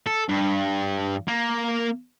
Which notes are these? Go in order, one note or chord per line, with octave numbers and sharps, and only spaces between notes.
A4
G2
A#3